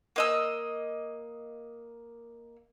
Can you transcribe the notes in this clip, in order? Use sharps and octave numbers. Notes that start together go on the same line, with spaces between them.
A#3 D#5 E6